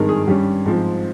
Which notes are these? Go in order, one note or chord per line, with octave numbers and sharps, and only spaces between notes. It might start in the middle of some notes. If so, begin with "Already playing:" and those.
Already playing: G#1 G2 D#3 G#3 A#4
G#4
G2 G3 C#4 G4
G#2 F3 C4